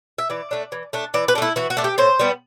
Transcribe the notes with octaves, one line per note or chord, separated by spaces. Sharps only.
E5
E3 D5
A3 D4
E3
A3 D4
E3 D5
B4
D4
A3 E4
E3 F#4
F#4
A3 D4
G4
A2 C5
G3 B3